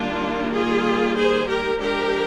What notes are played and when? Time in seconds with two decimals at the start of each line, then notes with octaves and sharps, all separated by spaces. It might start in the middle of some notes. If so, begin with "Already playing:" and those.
Already playing: D#3 G3 A#3 D4 F4
0.53 F4 G#4
1.16 G#4 C5
1.47 G4 A#4
1.79 F3 G#3 D4 G4 A#4